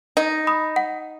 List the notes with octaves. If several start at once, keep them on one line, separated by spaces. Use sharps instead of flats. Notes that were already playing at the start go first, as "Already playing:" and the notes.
D#4 D#5
B5 D#6
F#5